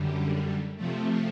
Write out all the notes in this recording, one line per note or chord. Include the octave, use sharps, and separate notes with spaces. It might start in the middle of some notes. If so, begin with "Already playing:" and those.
Already playing: F#2 D3 G3
C3 F3 A3